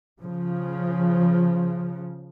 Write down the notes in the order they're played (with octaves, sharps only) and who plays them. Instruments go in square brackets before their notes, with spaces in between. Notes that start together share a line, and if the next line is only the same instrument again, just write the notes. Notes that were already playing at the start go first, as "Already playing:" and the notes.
[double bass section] C#3 F3